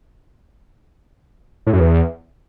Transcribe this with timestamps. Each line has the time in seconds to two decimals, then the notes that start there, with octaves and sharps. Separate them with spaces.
1.67 A2
1.73 F#2
1.80 E2